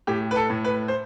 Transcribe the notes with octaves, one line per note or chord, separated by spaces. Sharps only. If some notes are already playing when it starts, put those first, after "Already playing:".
A2 G4
B4
A4
A2
B4
C5